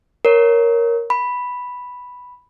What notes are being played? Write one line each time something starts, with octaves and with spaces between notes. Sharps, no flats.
A#4 C#5
B5